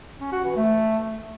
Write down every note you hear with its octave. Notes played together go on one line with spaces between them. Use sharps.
C#4
F#4
E3
A3